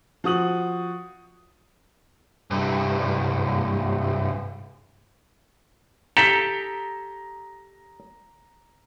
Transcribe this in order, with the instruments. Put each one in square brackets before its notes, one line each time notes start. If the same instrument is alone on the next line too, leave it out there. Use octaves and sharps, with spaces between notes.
[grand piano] F3 F#4 D#6 F#7
[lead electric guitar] C2 G2
[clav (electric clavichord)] G4 A4 [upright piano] A#5 B6 G7